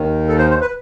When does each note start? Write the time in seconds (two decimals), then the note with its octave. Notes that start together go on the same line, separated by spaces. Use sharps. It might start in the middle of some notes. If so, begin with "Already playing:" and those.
Already playing: D#2 D#3
0.29 A4
0.38 C5
0.50 C5
0.61 B4